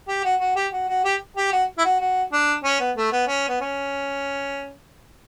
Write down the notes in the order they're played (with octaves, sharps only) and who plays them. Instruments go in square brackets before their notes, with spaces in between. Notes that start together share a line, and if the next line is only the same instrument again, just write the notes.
[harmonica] G4
F#4
F#4
G4
F#4
F#4
G4
G4
F#4
E4
F#4
F#4
D4
C#4
B3
A3
B3
C#4
B3
C#4